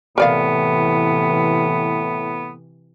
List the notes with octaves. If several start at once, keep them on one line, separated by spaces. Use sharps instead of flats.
A2 C3 E3 B3 A#4 D5 F5